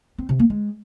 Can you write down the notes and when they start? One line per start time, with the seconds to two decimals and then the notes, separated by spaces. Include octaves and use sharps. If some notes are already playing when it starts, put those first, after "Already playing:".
0.18 C4
0.29 C3
0.39 A#3
0.50 G#3